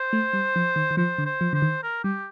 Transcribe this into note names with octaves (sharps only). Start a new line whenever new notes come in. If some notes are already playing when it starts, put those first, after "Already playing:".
Already playing: C5
A3
G3
F3
D#3
D#3
F3 C5
D3
C5
F3
D3 C5
D#3
A#4
G3 G4